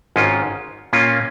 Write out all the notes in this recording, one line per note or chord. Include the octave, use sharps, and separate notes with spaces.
G#1 G#2 D#3 C#4 F4
A#2 A#3 C#4 F4